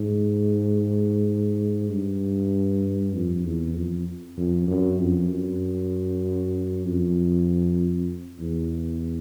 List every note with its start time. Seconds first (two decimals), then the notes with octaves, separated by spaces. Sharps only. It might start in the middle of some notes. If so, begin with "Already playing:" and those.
Already playing: G#2
1.90 G2
3.14 F2
3.45 E2
3.75 F2
4.38 F2
4.68 F#2
4.99 F2
5.30 F#2
6.85 F2
8.40 E2